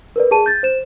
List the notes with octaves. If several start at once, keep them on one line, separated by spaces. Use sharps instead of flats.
A#4 B4 D5
G#4 A5 D#7
G6 A6
C5 E7